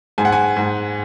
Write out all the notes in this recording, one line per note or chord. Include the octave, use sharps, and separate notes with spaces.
G#2 G#5
F#5
G#5
G#2